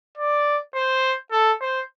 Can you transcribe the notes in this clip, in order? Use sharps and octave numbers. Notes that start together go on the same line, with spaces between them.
D5
C5
A4
C5